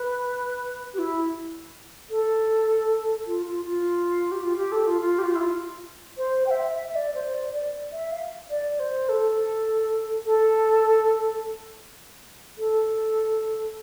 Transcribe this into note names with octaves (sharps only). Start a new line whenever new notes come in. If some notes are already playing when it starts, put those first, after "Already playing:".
Already playing: B4
G4
E4
A4
F4
F4
F4
G4
F4
G4
A4
F4
F4
G4
F4
E4
F4
C5
G5
E5
E5
D5
C5
D5
D5
E5
F5
D5
C5
A4
A4
A4